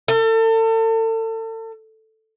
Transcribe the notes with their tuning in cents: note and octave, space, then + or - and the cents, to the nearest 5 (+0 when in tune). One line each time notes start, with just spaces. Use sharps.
A4 +35